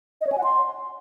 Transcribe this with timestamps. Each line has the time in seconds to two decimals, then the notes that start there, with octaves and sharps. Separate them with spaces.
0.21 D#5
0.27 C#5
0.32 G#5
0.38 F#5
0.44 C6